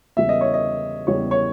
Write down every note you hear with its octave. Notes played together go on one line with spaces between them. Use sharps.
E2 C#3 G3 E5
D#5
C#5
D#5
E2 C#3 G3 C#5
C#5